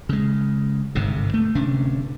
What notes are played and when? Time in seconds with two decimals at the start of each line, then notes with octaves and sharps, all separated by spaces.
0.09 C#3 G#3
0.95 G1 G#2 C3
1.34 A3
1.55 D1 C3 C#4 D4